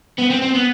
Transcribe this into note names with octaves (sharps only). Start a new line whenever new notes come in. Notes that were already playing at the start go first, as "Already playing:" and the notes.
B3
C4
C4
B3